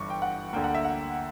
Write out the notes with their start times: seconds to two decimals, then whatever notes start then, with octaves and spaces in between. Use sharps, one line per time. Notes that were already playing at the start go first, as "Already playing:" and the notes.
Already playing: G1 G2 E3 C#6 D6
0.10 G5
0.22 F#5
0.53 D2 D3 A#3 G5
0.64 F#5
0.75 E5
0.85 F#5